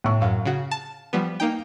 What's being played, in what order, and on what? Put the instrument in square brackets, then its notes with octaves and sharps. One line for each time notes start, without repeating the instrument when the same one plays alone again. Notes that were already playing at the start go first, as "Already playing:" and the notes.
[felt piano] A2 C#6
[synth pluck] F#2 [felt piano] F5
[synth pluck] C#3 F#4
A5
F3 G3 B3
A#3 D#4 G5